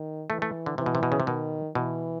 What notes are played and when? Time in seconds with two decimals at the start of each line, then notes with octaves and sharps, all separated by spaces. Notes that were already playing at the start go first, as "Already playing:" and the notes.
Already playing: D#3
0.30 E3 A3
0.42 A3
0.66 D3
0.78 C3 E3
0.86 B2
0.95 C3
1.03 B2
1.12 C#3
1.20 C3
1.27 B2 D#3
1.75 B2 E3